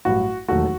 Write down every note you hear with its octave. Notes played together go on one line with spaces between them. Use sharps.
A1 G2 F#3 F#4
E1 D#2 D#3 F#3 A3 F#4